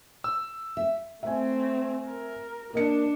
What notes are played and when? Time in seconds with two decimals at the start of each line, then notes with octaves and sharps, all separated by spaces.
0.24 E6
0.77 E5
1.23 A3 C4 E5 G#5
2.06 A#4
2.73 A#3 D4 D#5 C#7